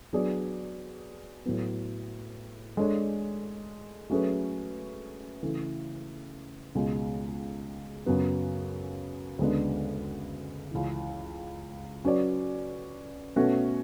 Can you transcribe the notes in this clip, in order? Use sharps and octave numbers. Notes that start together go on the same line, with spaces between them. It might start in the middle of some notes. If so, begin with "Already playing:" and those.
F#3 B3 D4 G#4 D5
A2 F#3 B3
G#3 D4 A4 C#5
F#3 A3 C#4 G#4 B4
C#3 E3 A3
C#2 B2 G#3
F#2 C#3 F#3 B3
D2 C#3 G#3 B3 D4
C#2 C#3 E3
F#3 C#4 F#4 B4 D5
B2 A3 C#4 F#4 B4